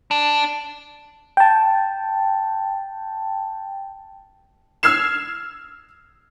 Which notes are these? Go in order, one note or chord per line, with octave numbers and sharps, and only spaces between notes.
D4
G5 A5
E6 F6 G#6 C7 E7